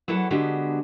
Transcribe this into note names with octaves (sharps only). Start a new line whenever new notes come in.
E2 F#3 E4 A4 F#5 A5
D3 G#3 B3 D4 F#4 G4